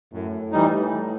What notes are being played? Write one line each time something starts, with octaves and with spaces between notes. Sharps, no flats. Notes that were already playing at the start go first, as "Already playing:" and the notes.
F#2 A2
E3 G3 D#4